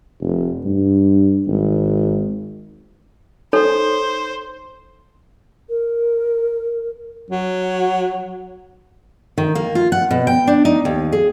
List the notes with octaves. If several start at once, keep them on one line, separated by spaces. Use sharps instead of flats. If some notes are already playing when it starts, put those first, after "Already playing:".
F1
G2
G#1
D#4 A4 C5 C#5
A#4
F#3
D#3
A#3
F4
F#5
B2
G5
D4
D#4
D#2
G#4